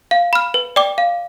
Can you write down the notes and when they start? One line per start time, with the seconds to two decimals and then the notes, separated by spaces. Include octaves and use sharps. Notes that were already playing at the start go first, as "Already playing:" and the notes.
0.11 F5
0.33 B5 F6
0.54 B4
0.76 D5 G5 D6
0.98 F5